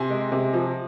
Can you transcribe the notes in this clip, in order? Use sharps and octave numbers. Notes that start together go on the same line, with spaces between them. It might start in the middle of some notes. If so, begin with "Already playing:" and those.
Already playing: C3 G#5 C6
G#3
C3
F3